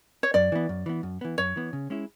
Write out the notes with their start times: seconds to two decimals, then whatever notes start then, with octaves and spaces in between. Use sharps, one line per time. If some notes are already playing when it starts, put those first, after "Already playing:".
0.23 C#5
0.34 F#2 D5
0.52 E3 B3
0.69 F#2
0.86 E3 B3
1.03 F#2
1.21 E3 B3
1.38 F#2 C#5
1.56 E3 B3
1.73 C#3
1.90 G#3 C#4 E4